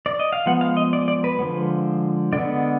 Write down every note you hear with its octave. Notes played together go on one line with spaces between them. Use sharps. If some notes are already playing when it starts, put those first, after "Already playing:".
D5
D#5
F5
F3 G#3 B3 F#5
F5
D#5
D5
D5
B4
D3 F3 G#3 B3
D3 G#3 B3 D5